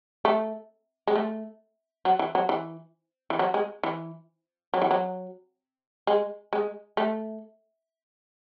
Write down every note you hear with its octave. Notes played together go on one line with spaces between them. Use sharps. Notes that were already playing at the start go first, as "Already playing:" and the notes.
A3
G#3
A3
F#3
E3
F#3
E3
E3
F#3
G#3
E3
F#3
E3
F#3
G#3
G#3
A3